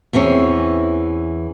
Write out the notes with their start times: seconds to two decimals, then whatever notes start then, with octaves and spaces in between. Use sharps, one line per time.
0.13 E2 E3 C4 C#4